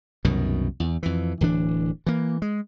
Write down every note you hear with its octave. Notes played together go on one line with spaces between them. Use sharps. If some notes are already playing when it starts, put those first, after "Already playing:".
C2 F#2 B2 D#3
E2
F2 E3
D1 E3 D4
E3 A#3
G#3